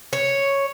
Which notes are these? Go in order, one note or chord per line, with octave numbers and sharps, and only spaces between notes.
C#5